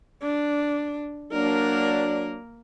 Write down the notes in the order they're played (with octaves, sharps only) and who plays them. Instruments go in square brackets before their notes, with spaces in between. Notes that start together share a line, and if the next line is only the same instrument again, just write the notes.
[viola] D4
[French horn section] F#3 D4 [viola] A#3 A#4